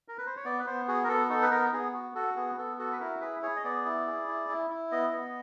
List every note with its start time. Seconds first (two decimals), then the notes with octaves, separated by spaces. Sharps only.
0.08 A#4
0.18 B4
0.26 C5
0.36 C#5
0.44 B3 D5
0.59 B4
0.66 B3 C5
0.88 F#4 G#4
1.04 A#4
1.08 B3 A4
1.30 D#4 A4
1.42 B4
1.51 B3 A#4
1.73 B3 G#4
1.94 F#4
2.15 F#4 A4
2.36 B3 G#4
2.57 B3 A4
2.79 F#4 A4
2.93 B4
3.00 E4 A#4
3.21 G#4 B4
3.43 G#4 C#5
3.56 D#5
3.64 B3 D5
3.85 E4
4.07 G#4
4.28 E4
4.49 E4
4.70 E4
4.91 B3 D#5
5.13 B3